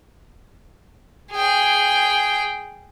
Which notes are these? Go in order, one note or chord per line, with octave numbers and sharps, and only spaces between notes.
G#4 G5